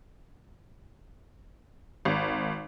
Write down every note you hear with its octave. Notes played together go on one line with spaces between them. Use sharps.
G#1